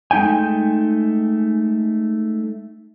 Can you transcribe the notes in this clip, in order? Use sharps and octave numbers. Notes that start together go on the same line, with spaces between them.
G#3 A3 D#4 G5 G#5